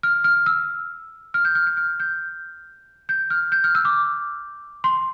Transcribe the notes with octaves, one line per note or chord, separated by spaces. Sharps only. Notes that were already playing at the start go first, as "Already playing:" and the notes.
F6
F6
E6
F6
G6
F6
G6
F6
G6
G6
F6
G6
F6
E6
D6
C6